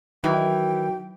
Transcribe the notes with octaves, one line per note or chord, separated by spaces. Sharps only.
D#3 E3 F#3 G5